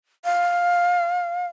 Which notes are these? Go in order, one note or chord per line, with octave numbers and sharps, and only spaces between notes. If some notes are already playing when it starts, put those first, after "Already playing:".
F5